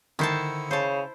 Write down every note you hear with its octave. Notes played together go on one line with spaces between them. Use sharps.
D3 D#3 E4 C5 A5 C#7
C#3 C5 A5